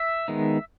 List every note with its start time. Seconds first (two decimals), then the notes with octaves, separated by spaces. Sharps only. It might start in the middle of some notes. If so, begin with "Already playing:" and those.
Already playing: E5
0.28 D#3 G#3 B3 D#4